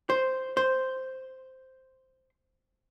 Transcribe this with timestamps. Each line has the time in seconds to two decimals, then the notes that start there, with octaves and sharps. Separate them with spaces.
0.10 C5
0.57 C5